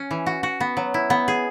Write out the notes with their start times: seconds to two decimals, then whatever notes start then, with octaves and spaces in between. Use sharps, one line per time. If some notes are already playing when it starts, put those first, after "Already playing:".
Already playing: C#4
0.11 E3
0.26 F#4
0.43 F#4
0.60 B3
0.77 F#3
0.94 E4
1.10 B3
1.28 G#4